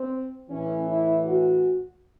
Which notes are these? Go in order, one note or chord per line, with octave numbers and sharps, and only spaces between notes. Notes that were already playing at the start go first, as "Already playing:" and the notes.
Already playing: C4
A2 E3 C#4
E4
F#4